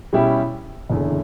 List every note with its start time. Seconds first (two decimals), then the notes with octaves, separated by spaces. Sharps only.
0.13 B2 G3 C#4 E4 G4
0.90 F#1 E2 D3